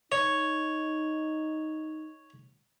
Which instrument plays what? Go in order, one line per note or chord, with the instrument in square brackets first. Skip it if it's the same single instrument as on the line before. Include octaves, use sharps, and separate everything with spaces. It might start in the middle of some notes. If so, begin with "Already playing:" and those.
[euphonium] D#4 [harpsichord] C#5